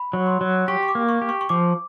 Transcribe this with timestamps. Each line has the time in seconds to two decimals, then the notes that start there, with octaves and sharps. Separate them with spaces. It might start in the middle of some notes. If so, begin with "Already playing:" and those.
Already playing: B5
0.13 F#3
0.27 C6
0.41 F#3
0.68 G4 C#6
0.83 C#6
0.88 D6
0.95 A#3
1.09 C#6
1.22 G4
1.29 C#6
1.41 C#6
1.49 F3 D6